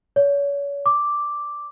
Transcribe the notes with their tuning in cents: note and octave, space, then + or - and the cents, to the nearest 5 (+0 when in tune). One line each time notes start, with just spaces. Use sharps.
C#5 +35
D6 +0